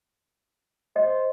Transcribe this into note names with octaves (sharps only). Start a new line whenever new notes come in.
C5 D#5